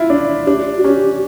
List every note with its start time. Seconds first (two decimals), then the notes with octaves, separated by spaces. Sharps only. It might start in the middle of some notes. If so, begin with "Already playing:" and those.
Already playing: E4 F4
0.10 D4
0.46 D4 G4
0.77 F#4
0.84 C#4 G4